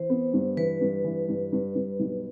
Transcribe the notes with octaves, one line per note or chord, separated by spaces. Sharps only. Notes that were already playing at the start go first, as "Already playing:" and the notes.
Already playing: E3 C5
B3
G2
E3 B4
G2
E3
G2
G2
G2
B1